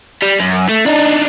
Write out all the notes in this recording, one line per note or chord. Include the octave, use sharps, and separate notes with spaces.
G3
F#2
A3
D4 D#4